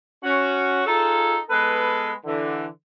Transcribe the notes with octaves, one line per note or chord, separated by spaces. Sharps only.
C#4 F#4
D#4 F4 G#4 A4
G#3 B3 A4 B4
D3 E3